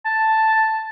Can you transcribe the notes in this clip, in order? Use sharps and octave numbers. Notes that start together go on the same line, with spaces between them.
A5